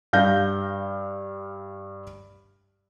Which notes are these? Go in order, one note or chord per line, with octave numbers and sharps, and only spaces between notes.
G2 F5 G6 A#6